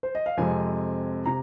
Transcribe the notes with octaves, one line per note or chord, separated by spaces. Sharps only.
C5
D#5
F5
F2 C3 G#3 C4 G#5
C3 A#5